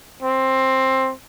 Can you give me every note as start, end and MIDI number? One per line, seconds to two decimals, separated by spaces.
0.23 1.12 60